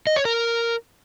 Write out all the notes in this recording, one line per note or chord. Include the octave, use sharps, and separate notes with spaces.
D#5
C#5
A#4